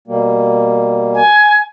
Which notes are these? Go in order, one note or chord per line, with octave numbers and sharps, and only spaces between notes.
B2 G3 A#3
G#5